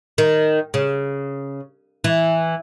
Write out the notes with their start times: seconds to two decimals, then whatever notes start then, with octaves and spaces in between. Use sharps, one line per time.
0.18 D#3
0.74 C#3
2.04 E3